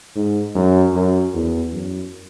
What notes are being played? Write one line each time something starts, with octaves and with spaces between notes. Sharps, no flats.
G#2
F#2
F#2
E2
F#2